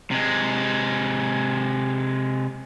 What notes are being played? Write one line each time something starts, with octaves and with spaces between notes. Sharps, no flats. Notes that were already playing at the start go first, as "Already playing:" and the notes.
C3 G#3